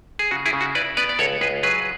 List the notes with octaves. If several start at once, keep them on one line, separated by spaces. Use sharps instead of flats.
G#4
C#3 F#4
E4 G#4
C#3
F#4
E4 B4 D5
B3 B4 D5
D5
C#2 A4 C#5
C#2 G#4 B4
F#3 G#4 B4